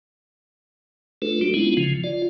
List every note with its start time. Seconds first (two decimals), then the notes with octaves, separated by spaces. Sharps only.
1.22 A3 D4 F4 A4 B4
1.41 G3 D4 F#4
1.54 G#3 B3 C#4 D4 E4 F4
1.77 C#3 F3
2.04 F4 D5